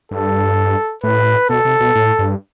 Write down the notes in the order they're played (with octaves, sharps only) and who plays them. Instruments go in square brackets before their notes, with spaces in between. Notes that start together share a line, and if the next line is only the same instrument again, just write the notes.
[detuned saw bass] G2 [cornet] A4
[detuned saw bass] A2 [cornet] B4
[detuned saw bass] B2 [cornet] A4
[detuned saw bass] C3
B2
A2
G2